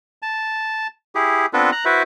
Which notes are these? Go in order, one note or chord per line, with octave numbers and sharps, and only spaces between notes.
A5
E4 G4 G#4
B3 C4 D4 F4 A4 B4
A#5 F#6
E4 F#4 B4 C5 E5